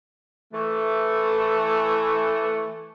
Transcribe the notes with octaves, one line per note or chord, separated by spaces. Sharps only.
E3 A3